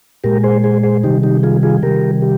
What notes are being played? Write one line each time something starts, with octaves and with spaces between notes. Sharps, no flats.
A#2 G#3 G4 A#4
G#4 C5
G#4 C5
G#4 C5
C3 D#3 G3 D#4 G4
D#4 G4
F4 G#4
F4 G#4
C3 D#3 G3 G4 A#4
G4